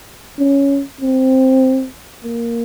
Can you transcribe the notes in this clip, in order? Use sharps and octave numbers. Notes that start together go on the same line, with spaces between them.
C#4
C4
A#3